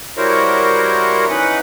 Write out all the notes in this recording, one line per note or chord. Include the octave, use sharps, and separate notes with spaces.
G3 E4 F#4 A#4 C5 C#5
E3 C#4 D#4 B4 F#5